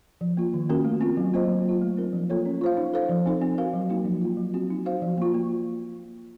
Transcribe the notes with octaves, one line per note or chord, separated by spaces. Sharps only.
F3
A#3 F4
D#3
A#3 C#4 F#4 A#4
A3
C4 F4
F#3
A#3 F4 C5 D#5
F#3
A#3 F4
A3
C4 D#4 A#4
F3
A#3 F4 A4 C#5
C#4
F4 C5 F5
D#4
A4 C5 F5
F3
C4 D#4 A4
C4
F#4 A#4 F5
F#3
A#3 D#4 F#4
F3
A#3 F4
F#3
C4 F#4
D#4
F#4 C5 F5
F3
A#3 F4
A#3